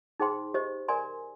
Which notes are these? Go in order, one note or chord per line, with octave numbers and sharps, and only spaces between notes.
D#4 G#4 C5 G5 C6
G4 C5 D#5
A#4 D5 G#5 C6